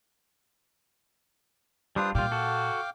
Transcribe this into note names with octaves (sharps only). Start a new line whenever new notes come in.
G3 D4 F4 B4 C5 D#6
A#2 G3 F4 F5 G5 D6
F#4 A4